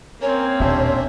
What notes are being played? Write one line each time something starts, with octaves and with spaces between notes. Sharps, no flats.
A#3 C4 C#4 A#4 C#5
D#1 B2 C#4 D4 E5